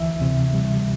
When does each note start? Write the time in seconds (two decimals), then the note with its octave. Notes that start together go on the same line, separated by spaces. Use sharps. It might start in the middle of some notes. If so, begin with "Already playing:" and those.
Already playing: D2 E3 E5
0.21 C3
0.54 G3